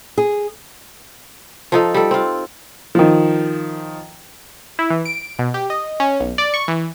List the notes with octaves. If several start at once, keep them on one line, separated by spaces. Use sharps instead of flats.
G#4
F3 D#4 A4
G3 A4
C4 F4
D#3 F3
E4
E3
D7
B2
G4
D#5
C#4
B1
D5
C#6
E3